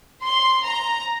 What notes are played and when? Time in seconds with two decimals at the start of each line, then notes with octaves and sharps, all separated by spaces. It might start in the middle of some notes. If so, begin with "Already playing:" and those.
0.23 C6
0.64 A#5